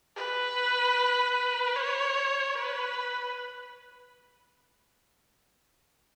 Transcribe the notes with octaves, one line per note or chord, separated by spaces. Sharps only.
B4
C#5
B4